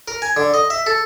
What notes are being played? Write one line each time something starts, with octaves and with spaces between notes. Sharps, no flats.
A#4
G#5
D3
D#5
E5
A4